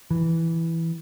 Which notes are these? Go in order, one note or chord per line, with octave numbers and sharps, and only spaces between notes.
E3